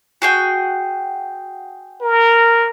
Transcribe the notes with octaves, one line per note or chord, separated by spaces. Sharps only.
F#4 G#4 G5
A#4